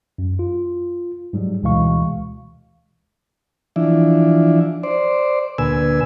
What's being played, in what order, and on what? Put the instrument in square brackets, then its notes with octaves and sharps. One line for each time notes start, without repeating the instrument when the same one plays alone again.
[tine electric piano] F#2
F4
G#2 F#3 G3
D2 B2 E3 G#3 F5 C#6
[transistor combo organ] E3 F3 D4 E4
C5 D5
D2 A#2 B4 G#5 E6